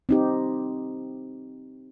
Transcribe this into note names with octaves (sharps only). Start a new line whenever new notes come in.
C4 D#4 G4